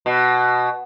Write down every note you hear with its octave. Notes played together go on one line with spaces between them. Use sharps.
B2